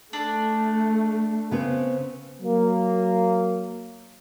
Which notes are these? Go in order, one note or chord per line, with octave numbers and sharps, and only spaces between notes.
A3 D4
C#3 B3 C4
F#3 A#3